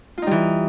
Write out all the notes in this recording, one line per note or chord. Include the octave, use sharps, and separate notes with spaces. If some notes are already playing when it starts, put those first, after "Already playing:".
E3 G3 D#4 F4